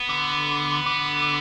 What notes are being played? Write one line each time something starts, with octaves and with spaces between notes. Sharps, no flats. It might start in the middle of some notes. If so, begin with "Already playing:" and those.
Already playing: B3
D3
D3